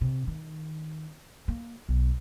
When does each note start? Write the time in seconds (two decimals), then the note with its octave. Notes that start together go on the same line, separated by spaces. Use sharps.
0.01 C3
0.27 D#3
1.48 A#3
1.89 B1